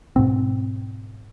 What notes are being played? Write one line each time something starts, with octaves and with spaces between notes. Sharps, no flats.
G#2 B2 C4